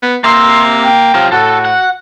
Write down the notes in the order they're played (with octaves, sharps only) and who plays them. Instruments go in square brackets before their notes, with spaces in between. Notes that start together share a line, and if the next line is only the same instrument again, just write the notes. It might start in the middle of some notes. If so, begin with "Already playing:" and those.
[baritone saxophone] B3
[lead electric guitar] C3 E5 [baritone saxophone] A#3 [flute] C6
[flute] G5
[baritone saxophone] C3 [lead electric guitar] F#3 F4
[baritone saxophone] A2 [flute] F#4 [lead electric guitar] A4
[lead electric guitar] F#5